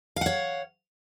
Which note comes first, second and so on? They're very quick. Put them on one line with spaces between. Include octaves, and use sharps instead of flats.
F5 F#5 C#5